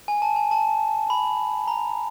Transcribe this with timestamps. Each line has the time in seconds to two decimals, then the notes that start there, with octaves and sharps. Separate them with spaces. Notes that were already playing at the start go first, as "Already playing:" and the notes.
0.08 G#5
0.22 A5
0.36 G#5
0.51 A5
1.10 B5
1.68 A#5